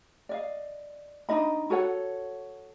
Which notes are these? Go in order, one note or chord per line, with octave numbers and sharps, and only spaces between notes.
D5 D#5 F5
D4 D#4 D#5 B5
F#4 A4 C#5 F#5